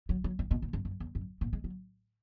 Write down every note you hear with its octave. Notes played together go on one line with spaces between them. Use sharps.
F#3
F#3
D#3
B2
A#2
F#2
F#2
E2
F#2
A#2
G#3
F#3